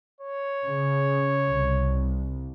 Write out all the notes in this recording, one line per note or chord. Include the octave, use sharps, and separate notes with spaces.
C#5
C#3
C2